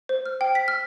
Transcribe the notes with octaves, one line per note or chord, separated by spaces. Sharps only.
C5
F6
G5
B6
F6